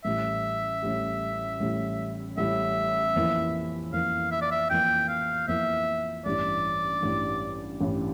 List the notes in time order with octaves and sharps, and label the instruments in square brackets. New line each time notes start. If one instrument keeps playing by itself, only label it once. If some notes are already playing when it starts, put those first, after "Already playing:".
[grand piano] A1 A2 G3 [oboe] E5
[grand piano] A1 A2 G3
A1 A2 G3
[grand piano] A1 A2 G3 [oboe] E5
[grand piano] F2 E3 A#3
[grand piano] F2 E3 A#3 [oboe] F5
[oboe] E5
D5
E5
[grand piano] F2 E3 A#3 [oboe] G5
[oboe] F5
[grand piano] F2 E3 A#3 [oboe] E5
[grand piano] A1 G2 E3 G3 [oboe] D5
[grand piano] A1 G2 E3 G3
A1 G2 E3 G3